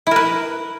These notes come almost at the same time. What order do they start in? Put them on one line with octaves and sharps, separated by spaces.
E4 A#4 B4